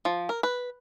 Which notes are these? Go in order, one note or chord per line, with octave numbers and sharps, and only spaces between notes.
F3
A#4
B4